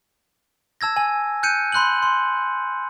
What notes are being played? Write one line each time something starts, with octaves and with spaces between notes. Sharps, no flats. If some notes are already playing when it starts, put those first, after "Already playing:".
A5 E6 G#6 A#6
G#5
F#6 G6 C#7 D#7
B5 C6 F#6 G6 F#7
C6